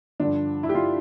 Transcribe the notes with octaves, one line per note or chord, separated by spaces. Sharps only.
G2 D3 F3 D4
E4
G4
F4